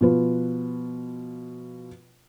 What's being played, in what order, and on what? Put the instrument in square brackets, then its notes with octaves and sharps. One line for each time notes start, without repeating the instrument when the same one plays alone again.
[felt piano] B2 F3 F4 B4